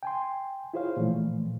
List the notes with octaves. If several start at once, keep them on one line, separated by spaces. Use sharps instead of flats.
G5 G#5 C6
E4 F4 G#4 C5 C#5 F5
A#2 E3 F3 A3